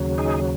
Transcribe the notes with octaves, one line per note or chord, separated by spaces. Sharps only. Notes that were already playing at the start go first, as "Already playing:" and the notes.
Already playing: D#2 C#3 F#3
D#4 G#4